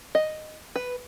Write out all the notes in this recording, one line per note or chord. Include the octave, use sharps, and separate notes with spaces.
D#5
B4